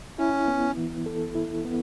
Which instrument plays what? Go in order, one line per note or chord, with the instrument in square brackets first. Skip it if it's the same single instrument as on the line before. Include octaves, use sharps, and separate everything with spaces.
[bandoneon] C#4 [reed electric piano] E4
[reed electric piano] B3
E3
A4
E4
B3